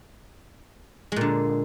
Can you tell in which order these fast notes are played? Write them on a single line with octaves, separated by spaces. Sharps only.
G#3 A#2 D3